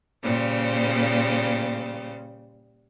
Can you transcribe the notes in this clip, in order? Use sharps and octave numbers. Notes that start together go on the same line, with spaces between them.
A#2 C#3 G3 C5